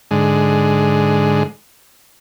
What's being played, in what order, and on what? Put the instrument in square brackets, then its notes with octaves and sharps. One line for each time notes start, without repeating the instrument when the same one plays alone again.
[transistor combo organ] G#2 D3 G#3